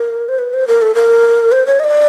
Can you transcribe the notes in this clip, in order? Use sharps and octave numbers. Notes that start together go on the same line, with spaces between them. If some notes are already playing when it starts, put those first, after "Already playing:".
Already playing: A#4
C5
B4
C5
A#4
A4
A#4
C5
C#5
D#5
D5